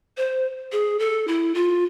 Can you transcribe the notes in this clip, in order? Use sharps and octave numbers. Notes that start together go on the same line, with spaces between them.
C5
G#4
A4
E4
F4